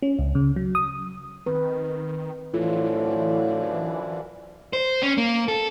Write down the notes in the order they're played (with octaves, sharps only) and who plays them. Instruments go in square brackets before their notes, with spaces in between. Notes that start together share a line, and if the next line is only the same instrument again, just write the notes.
[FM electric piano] C#4
C#2
C#3
F#3
D#6
[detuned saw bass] D#3 [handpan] C4 B4
[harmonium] F#2 D3 F3 [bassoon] A2 [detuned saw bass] E3 [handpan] F4
[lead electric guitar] C5
C#4
A#3
A4